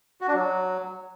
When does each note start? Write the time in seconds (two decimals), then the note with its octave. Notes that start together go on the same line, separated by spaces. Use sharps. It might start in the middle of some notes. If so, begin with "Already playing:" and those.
0.21 F#4
0.28 D4
0.34 F#3